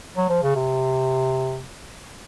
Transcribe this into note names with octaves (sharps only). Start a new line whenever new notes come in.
F#3
F3
C#3
C3